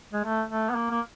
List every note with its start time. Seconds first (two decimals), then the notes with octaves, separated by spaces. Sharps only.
0.13 G#3
0.24 A3
0.49 A3
0.70 B3
0.75 A#3
0.91 A#3